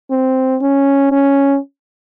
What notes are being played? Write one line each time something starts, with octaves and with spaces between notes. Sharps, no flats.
C4
C#4
C#4